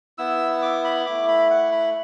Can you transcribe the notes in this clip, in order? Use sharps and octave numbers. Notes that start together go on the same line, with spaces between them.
B3 E4 E6
D6
B5
A3 E4 D6
B5
F#5
B5